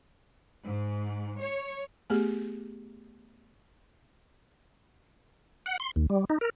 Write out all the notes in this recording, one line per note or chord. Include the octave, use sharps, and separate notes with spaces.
G#2
C#5
A3 B3 G4 G#4
F#5
C6
D#2
G3
D#4
A#4